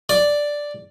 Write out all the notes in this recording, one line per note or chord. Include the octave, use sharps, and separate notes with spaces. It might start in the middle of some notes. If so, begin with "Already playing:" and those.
D5